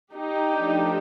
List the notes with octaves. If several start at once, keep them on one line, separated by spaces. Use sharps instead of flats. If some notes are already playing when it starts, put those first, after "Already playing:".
D#4 G4
F3 A3 D4